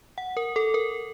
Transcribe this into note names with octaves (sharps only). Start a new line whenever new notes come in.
F#5
A#4
A4
A#4